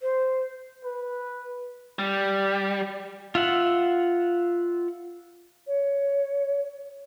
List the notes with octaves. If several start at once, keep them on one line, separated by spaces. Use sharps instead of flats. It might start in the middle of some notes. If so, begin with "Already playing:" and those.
C5
B4
G3
F4 E5 F#5
C#5